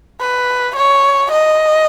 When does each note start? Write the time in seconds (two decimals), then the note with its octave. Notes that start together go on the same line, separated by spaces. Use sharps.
0.20 B4
0.76 C#5
1.32 D#5